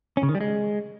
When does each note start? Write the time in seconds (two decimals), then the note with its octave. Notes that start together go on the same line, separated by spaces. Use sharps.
0.17 C#4
0.23 C#3
0.29 D#3
0.35 G3
0.41 G#3